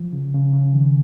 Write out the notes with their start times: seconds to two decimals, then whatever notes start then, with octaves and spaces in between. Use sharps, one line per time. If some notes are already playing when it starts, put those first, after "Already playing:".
Already playing: F3
0.13 C#3
0.34 C#3
0.53 C#3
0.73 D#3